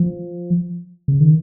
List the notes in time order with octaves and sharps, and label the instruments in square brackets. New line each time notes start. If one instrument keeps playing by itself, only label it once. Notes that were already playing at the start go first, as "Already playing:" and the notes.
Already playing: [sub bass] F3
C#3
D#3